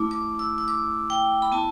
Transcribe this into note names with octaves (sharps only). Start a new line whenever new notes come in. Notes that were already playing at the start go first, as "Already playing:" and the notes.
Already playing: A3 E4 D6
D6
E6
E6
D6
G5
B5
B3 E4 A5